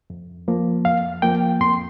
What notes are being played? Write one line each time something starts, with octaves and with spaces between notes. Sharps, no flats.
F2
F3 A#3
F2 F5
F3 A#3 G5
F2 C6